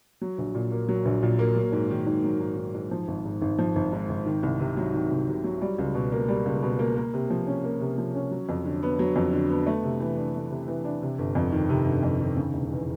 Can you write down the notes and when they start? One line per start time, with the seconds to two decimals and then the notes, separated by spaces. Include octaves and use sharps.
0.21 F#3
0.38 A#1
0.55 A#2
0.72 A#3
0.89 F#3
1.05 A#1
1.23 A#2
1.39 A#3
1.56 F#3
1.72 G#2
1.90 D#3
2.07 G#2
2.24 F#3
2.40 G#2
2.57 D#3
2.75 G#2
2.91 F3
3.08 G#1
3.25 G#2
3.41 G#1
3.58 F3
3.76 G#1
3.92 G#2
4.09 G#1
4.26 D#3
4.43 C2
4.60 C3
4.77 F#3
4.94 D#3
5.11 C2
5.28 C3
5.44 F#3
5.61 G3
5.78 C#2
5.95 B2
6.12 A#3
6.28 G3
6.46 C#2
6.63 B2
6.79 A#3
6.97 A#3
7.14 C3
7.30 F3
7.47 C#4
7.64 A#3
7.80 C3
7.98 F3
8.15 C#4
8.31 F#3
8.49 F2
8.65 D3
8.83 B3
8.99 F#3
9.16 F2
9.33 D3
9.50 B3
9.67 A3
9.83 C3
10.00 E3
10.17 D4
10.34 A3
10.50 C3
10.68 E3
10.85 D4
11.02 C3
11.18 G1
11.35 F2
11.52 D#3
11.69 C3
11.86 G1
12.03 F2
12.20 D#3
12.37 C#3
12.54 E1
12.71 E2